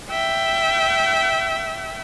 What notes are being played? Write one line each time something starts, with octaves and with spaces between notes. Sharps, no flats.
E5 G5